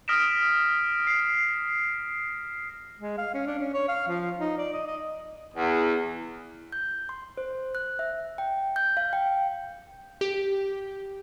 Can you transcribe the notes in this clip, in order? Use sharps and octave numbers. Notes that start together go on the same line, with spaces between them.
D#6 F6 A#6 B6 D7 E7
C7
G#3
F5
C#4
D4
C#4
C#5
F5
F3
D#4
D5
D#5
D#5
E2
G6
C6
C5
F#6
E5
G5
G6
F5
G5
G4